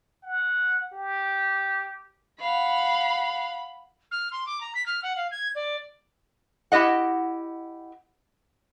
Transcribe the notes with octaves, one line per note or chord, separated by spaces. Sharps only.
F#5
G4
F5 F#5 B5
F6
C6
D6
A#5
B6
F6
F#5
F5
G#6
D5
E4 G4 D#5 F#5